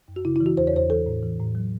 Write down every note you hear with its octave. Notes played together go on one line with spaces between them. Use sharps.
F#2
F#4
C#3 E4
E4
E3
F#4
E2 C5
C#5
E2 C5
E3 A4
A2
E3
A2
F#3